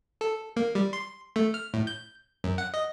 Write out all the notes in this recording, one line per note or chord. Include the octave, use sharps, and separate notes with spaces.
A4
A#3
G3
C6
A3
F6
A2
G6
F#2
F#5
D#5